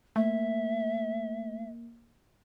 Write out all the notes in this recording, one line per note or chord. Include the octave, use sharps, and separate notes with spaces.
A3 A#3 E5